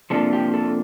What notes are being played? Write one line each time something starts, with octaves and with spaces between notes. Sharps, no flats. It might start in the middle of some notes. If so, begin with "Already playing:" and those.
C3 F3 A#3 D4 A4
G4
A4